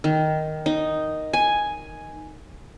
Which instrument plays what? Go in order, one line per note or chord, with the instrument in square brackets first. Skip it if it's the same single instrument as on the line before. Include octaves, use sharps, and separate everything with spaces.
[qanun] D#3
D#4
G#5